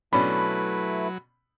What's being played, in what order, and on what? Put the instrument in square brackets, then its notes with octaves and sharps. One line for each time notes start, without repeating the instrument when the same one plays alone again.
[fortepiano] B2 C#4 D4 [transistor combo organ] F#3 [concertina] A3 E4 B4 [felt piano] B5